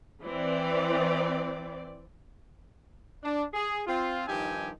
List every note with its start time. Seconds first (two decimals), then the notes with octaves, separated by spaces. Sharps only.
0.24 E3 C4 D5
3.23 D4
3.54 G#4
3.86 C4 F4
4.27 G2 D#3 F3 D#4 G4 G#5